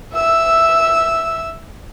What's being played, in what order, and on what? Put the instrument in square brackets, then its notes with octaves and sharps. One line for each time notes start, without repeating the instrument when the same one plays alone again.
[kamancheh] E5 E6